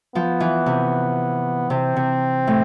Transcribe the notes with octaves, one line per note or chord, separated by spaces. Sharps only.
F3 B3
E3
C3
C3 C4
C3
A2